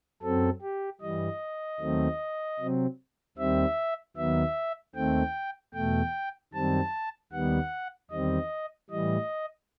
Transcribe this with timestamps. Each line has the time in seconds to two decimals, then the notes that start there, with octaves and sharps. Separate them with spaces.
0.22 F#2 F#3 C4 A4
0.62 G4
1.01 G2 E3 G3 D#5
1.80 D#2 D#3 F#3 A3 C4
2.59 C3 F#3 C4
3.37 D#2 D#3 G3 C4 E5
4.16 D#2 D#3 F#3 B3 E5
4.95 D#2 D#3 A3 C4 G5
5.74 E2 B2 A3 G5
6.53 F#2 D#3 G3 C4 A5
7.32 D#2 D#3 G3 B3 F#5
8.10 E2 D#3 G3 C4 D#5
8.90 A2 E3 G3 D#5